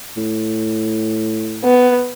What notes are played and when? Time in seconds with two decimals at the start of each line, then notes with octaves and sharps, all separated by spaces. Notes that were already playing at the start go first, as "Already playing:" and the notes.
0.17 A2
1.64 B3